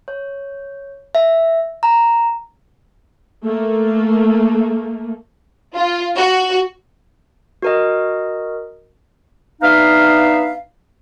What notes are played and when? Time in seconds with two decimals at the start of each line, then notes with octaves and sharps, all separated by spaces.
0.08 C#5
1.15 E5
1.83 A#5
3.45 A3 A#3
5.75 F4
6.17 F#4
7.62 F#4 A#4 D#5
9.62 B3 D4 D#4 E5 F5